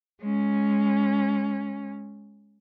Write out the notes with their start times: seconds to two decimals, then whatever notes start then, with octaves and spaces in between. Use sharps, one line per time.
0.21 G#3 C#4